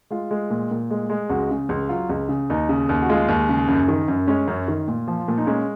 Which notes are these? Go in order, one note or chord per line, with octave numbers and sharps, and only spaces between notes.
G#3 F4
G#3
A#2
A#2
G#3
G#3
C#2 F#4
C#3
C#2
F#3 F4
C#2
C#3
D#2 D#4
C#3
D#2
F#4
G#3 F4
D#2
C#3
F#2
D#3
F#2
G#3 C#4
F#2
D#3
A#2
F3
A#2
D#4
G#3 C#4